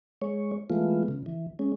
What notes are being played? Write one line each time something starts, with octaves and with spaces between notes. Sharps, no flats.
G#3 C#5
E3 G#3 A3 B3 F4
C#3
E3
G#3 C#4